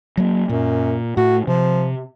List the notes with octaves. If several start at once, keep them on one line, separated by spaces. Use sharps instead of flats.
F#3 A#3
F#2 A#2
A2 F#4
C3 F3